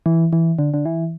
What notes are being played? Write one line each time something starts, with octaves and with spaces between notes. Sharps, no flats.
E3
E3
D3
D3
E3